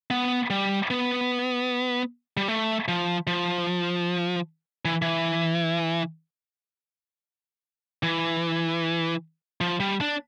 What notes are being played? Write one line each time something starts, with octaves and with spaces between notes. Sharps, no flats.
B3
G3
B3
G3
A3
F3
F3
E3
E3
E3
F3
G3
D4